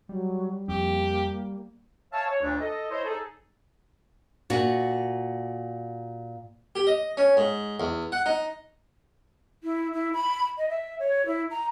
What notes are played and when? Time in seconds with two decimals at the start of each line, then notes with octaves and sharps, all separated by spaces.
0.09 F#3 G3
0.68 F2 A#3 G4
2.13 C#5 E5 F5 G#5 A5
2.27 C#5
2.42 D2 A#2 D4
2.60 A4 D#5
2.90 E4 C5 C#5 D#5
3.05 D#4 G#4 A4
4.50 A#2 F#4
6.75 G4
6.87 D#5
7.17 C#4
7.37 G#2
7.80 E2
8.12 F#5
8.26 D#4
9.64 E4
9.93 E4
10.13 B5
10.58 D#5
10.69 E5
11.00 C#5
11.26 E4
11.51 A#5